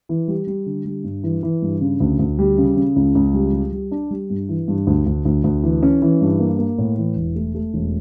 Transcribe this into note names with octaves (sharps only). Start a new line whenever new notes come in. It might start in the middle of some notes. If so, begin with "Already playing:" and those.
E3
G3
G3
D3
G3
G2
E3
E3
G2
C#3
D2
D2
G3
C#3
C#3
C#2
C#2
G3
G3
G3
D4
G3
G2
E3
G2
D2
D2
D2
D2
E3
C#4
E3
G2
A#3
A#3
A2
E3
E1
A3
A3
E1